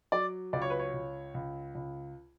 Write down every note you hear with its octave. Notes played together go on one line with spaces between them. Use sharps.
F#3 D5
C#2 D5
C#5
B4
C#5
C#2
C#2
C#2